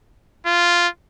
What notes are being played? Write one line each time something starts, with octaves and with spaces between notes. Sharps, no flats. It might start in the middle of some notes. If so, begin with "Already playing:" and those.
F4